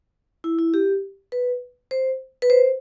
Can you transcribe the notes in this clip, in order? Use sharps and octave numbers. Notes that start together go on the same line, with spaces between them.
E4
E4
G4
B4
C5
B4
C5